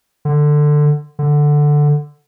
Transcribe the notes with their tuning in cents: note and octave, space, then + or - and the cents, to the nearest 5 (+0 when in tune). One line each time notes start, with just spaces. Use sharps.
D3 +15
D3 +5